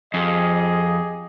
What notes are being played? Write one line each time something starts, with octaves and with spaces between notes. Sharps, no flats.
F2 G4 G#4 D#5